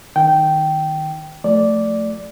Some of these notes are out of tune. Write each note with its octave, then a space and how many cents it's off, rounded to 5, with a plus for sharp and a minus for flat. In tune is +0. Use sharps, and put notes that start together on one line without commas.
D#3 +0 G5 -15
F3 +20 A3 +5 D5 -5